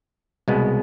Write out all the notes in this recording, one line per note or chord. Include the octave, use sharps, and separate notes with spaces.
C2 B2 G#3 B3